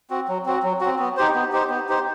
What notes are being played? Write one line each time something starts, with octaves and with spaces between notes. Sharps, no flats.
C4 F#4
F#3
C4 F#4
F#3
C4 F#4
B3
D#4 G4 C5
B3
D#4 G4 C5
B3
D#4 G4 C5